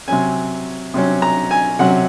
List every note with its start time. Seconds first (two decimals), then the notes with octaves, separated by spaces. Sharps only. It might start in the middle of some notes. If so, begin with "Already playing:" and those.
0.08 C3 F#3 C#4 G#5
0.94 C3 F#3 C#4
1.22 A#5
1.51 G#5
1.79 C3 F#3 C#4 F#5